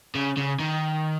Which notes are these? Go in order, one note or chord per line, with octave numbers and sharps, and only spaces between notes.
C#3
C#3
D#3